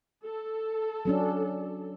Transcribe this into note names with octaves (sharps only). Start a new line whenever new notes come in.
A4
F#3 C#4 D4